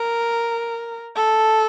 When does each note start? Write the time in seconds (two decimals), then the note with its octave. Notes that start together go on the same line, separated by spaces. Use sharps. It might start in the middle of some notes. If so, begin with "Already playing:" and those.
Already playing: A#4
1.16 A4